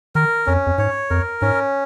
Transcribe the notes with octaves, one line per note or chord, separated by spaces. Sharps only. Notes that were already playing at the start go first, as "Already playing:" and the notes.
D#3 A#4
F2 C#4
F2
G#2 C#5
F2 A#4
G#2 C#4